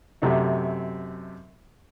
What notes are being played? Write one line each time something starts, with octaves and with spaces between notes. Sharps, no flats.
F#2 C3 A3 D#4